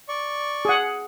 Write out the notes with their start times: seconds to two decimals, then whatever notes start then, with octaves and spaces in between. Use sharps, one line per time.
0.09 D5 C#6
0.65 G#4 F#5